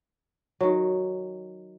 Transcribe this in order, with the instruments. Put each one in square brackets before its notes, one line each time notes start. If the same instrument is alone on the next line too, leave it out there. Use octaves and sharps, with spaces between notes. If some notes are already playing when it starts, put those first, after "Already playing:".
[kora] D#3 F#3